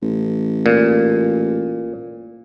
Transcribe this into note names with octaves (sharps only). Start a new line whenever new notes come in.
A1
A#2